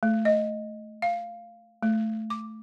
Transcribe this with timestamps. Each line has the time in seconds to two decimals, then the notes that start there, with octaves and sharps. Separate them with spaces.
0.03 A3
0.25 D#5
1.02 F5
1.83 A3
2.30 D6